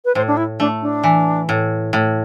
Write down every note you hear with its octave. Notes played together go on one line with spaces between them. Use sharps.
B4
A2 C5
D4
E4
A3 D4
D4
E3
A2
A2